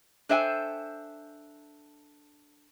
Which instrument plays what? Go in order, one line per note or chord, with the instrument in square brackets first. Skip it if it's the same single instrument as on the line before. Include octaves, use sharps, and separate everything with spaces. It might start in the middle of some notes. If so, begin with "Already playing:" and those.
[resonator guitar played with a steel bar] D4 A4 C5 E5 G5 G#5